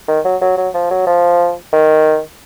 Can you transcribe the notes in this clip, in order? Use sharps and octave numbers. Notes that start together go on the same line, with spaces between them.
D#3
F#3
F#3
F#3
F3
F#3
F3
D#3